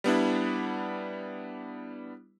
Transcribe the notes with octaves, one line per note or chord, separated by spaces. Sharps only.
G3 B3 D4 E4